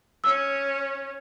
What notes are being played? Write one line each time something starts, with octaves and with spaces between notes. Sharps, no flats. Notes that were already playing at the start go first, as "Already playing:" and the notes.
C#4 E6